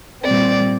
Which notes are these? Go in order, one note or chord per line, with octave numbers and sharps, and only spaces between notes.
A#2 G3 C4 D5